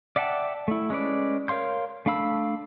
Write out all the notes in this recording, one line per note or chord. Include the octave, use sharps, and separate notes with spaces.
D5 E5 F#5 G5 A5
A3 E4
G#3 C#4 B4 D5
A#4 C#5 F5 C6 G6
A3 D4 F5 B5 E6